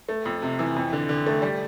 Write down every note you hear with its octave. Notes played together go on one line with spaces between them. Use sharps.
A3
F2
C3
E3
F2
D3
D3
A3
G3